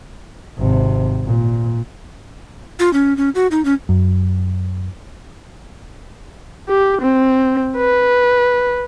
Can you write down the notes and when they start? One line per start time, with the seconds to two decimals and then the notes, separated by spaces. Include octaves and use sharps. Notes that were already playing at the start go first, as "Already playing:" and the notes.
0.58 G#1 C3
1.26 A#2
2.79 F4
2.93 C#4
3.17 C#4
3.35 F#4
3.51 D#4
3.65 C#4
3.89 F#2
6.68 G4
7.01 C4
7.77 B4